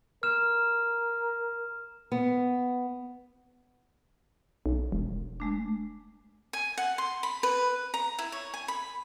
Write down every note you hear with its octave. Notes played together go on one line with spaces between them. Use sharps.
A#4 F6 E7
B3
B1
E1
G#3 A3 D4
G#5
F#5
C6
B5
B4
A#5
E4
C#5
G#5
B5